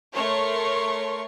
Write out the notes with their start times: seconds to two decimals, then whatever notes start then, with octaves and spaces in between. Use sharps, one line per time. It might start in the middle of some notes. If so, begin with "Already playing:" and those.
0.14 A3 A#4 C#5 C6 C#6